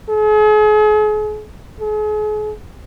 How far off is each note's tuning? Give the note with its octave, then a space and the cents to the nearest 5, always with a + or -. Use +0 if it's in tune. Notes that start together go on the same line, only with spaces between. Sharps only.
G#4 +40
G#4 +40